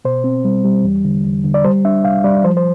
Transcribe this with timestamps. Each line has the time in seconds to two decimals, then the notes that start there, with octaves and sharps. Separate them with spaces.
0.05 B2 C5
0.24 C4
0.45 G3
0.65 G3
0.84 E2
1.05 D3
1.24 E2
1.44 D3
1.54 D5
1.64 G3 C5
1.85 D4 E5
2.04 C2 F5
2.24 G3 D5
2.44 F3 C5
2.57 C5